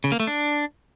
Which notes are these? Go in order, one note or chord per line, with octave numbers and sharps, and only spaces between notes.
C#3
A#3
A3
D4